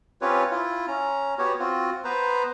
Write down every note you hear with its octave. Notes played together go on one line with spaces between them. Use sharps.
C4 C#4 F4 G4 B4 C#5
E4 F4
C#4 A#5
B3 F#4 G4 C#5
C4 F4 F#4
B3 B4 C5 A#5